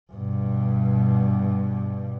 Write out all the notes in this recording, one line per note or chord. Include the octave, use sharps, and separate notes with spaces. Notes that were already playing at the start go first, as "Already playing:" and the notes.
G2 B2